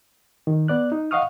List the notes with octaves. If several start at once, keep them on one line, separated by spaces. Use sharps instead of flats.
D#3
B3 D5 F#6
D#4
D#5 F5 F#5 C#6 D#6 F6